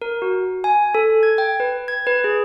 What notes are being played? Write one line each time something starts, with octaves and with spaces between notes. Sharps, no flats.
A#4
F#4
G#5
A4
G#6
G5
B4
G#6
B4
G#4